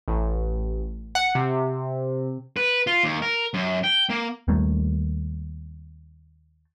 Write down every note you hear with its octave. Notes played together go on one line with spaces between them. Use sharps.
A1
F#5
C3
B4
F4
D#2
A#4
F#2
G5
A#3
D#2 G3 A3 A#3